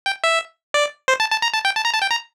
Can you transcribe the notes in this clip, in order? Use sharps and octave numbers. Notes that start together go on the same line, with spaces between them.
G5
E5
D5
C5
A5
A5
A#5
A5
G5
A5
A#5
A5
G5
A#5